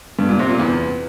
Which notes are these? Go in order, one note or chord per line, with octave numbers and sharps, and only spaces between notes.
G2
A#2
C3
A#2
E2